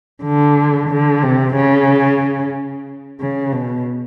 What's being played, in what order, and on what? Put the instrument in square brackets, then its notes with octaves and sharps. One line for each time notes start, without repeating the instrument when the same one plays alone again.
[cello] D3
D3
C3
C#3
C#3
B2